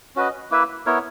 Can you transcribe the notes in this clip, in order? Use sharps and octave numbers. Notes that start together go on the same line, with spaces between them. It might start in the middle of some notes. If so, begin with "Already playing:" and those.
C#4 F#4 B4 D#5
A#3 E4 B4 E5
B3 E4 A#4 C#5